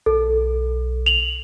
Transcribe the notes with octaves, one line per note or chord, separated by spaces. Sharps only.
B1 A4
F7 F#7